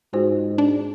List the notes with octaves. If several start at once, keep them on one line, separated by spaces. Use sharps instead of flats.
G#2 F4 F#4 C5
D4